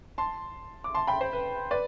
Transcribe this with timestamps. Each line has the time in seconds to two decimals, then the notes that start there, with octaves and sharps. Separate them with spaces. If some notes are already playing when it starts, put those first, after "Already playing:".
0.18 A5 C6
0.84 D6
0.95 A5 C6
1.07 G5 B5
1.21 C5
1.33 B4
1.71 B4 D5